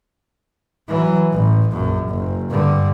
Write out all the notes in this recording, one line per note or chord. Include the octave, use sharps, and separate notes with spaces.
E3 F#3
A1
A#1 F#2
F#1
G2 D3